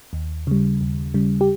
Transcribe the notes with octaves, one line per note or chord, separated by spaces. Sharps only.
D#2
C#3 G3
D#2
C#3 G3
G4